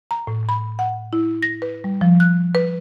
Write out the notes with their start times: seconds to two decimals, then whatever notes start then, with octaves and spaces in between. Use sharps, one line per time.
0.11 A#5
0.27 A2
0.49 B5
0.79 F#5
1.13 E4
1.43 A#6
1.62 B4
1.84 G3
2.01 F3
2.20 F#6
2.55 B4